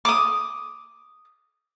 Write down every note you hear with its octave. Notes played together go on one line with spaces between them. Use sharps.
D6 D#6